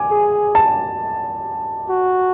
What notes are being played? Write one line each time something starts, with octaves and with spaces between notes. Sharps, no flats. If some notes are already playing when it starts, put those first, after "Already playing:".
Already playing: G#5 D6
G#4
A5
F#4